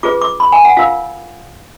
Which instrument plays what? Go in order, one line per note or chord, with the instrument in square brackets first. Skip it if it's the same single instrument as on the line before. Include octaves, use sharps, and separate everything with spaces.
[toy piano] F4 G#4 B4 D6
D6
B5
G#5
F#5
F4 A#4 F5